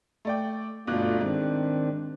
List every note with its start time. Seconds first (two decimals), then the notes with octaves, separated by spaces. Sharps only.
0.25 A3 D5 G5
0.87 G1 B2 A3 D4 F4 F#6
1.21 G#2 D#3 C4 D4